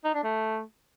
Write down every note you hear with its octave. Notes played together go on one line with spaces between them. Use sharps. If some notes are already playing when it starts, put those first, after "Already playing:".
D#4
D4
A3